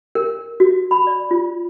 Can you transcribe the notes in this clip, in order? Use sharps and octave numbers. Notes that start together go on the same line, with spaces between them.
A#4
F#4
B5
D5
F4